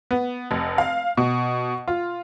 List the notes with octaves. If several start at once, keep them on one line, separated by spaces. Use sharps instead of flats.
B3
F1
F5
B2
F4